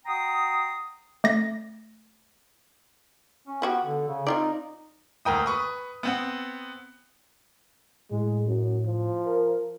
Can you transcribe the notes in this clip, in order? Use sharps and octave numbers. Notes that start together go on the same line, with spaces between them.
F#4 G5 A#5 C6 D#6
A3 A#6
C#4
F3 B3 F#4 G4
D3
C#3
C4 D#4 F4 D5
D2 A#4 G5 D#6
B4 C#6 D#6
B3 C4 F#5
A2 G#3
F#2
F3
A#4